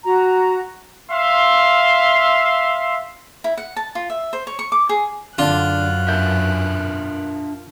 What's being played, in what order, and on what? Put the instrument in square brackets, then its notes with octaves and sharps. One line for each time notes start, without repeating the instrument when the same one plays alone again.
[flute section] F#4 A#5
[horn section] E5 F5 C6
[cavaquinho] E4
F#5
A5
F4
E5
C5
C#5
C#6
D6
G#4
[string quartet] F#2 F#6 [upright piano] D3 D4 [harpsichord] F4
[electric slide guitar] D4 A#4 E5 [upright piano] G6